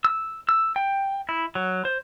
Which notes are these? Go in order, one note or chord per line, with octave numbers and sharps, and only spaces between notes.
E6
E6
G5
E4
F#3
C5